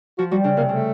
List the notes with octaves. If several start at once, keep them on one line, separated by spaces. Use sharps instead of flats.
F3 F#4
G3 F#4
C#3 D4
C3 A#3
C#3 A3